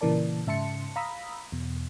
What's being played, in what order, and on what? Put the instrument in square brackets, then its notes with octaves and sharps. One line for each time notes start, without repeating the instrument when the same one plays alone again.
[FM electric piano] A#2 C#3 E3 A#4 D5 A5
G#2 C#3 E5 A5 C6 C#7
F5 A#5 B5 D#6 E6 B6
E2 B2